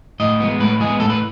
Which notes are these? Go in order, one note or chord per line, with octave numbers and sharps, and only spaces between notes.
A2 D#5
G#3 B3
A2 B4
G#3 B3 G#4
A2 A4
B4